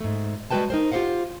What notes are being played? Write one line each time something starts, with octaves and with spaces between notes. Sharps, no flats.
G#2 A3
G3 G#3 F#4 B4 G5 A5
D#4 A#4 C5
F4 G4 A#4 C5 F5 F#5